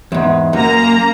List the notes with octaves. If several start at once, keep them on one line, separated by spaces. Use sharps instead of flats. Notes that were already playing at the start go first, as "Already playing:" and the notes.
E2 G#2
F#2 A#3 A#5